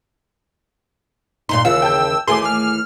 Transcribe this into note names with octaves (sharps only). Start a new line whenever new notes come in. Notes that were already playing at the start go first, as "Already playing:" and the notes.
G2 A#2 D#4 C6
D#2 C#3 E3 F4 E6
G5 A5 G6
D#2 E3 A3 G#4 G#5 C6 D6
F6